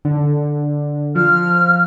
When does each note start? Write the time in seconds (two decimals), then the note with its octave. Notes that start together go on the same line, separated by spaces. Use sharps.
0.05 D3
1.15 F3 F6